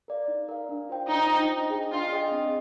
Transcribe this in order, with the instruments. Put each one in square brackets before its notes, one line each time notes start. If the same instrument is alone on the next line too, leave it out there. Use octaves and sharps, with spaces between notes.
[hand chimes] A#4 D5 F5
D#4
A#4 D5 F5
D4
F4 C5 G5
[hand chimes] D4 [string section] D#4
[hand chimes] F4 C5 G5
D4
G#4 D#5 G5
[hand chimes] D4 [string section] F4
[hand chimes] G#4 D#5 G5
C4